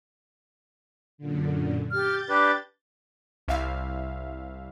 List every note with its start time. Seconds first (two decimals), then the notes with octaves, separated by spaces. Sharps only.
1.18 F#2 A#2 D3
1.92 G4 F6 G6 A6
2.29 D4 G4 B4 D6
3.48 C2 E5 F5